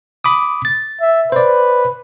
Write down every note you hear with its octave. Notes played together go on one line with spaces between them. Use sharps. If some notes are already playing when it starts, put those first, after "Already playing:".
B5 D6 D#6
A6
E5
B4 C5 D5